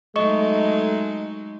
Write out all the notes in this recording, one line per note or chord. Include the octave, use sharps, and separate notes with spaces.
F#3 G#3 A3 D#4 D#5 C#6